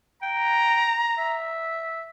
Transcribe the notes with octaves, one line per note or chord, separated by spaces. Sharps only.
G5 A#5
E5